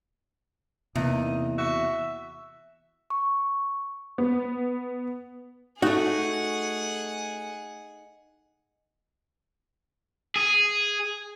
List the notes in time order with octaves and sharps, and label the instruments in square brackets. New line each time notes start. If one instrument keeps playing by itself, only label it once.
[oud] E2 [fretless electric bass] C3 A#3 [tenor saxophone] D#4
[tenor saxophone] F#4 [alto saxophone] E5
[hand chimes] C#6
[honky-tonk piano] B3
[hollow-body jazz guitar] A3 F#4 [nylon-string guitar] D#4 [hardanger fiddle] G#4 F#5
[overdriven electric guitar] G#4